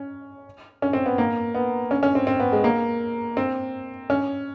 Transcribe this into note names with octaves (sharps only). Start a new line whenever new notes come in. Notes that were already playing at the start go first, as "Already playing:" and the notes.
Already playing: C#4
C#4
C4
B3
A#3
B3
C#4
C#4
C4
C4
B3
G#3
A#3
C4
C#4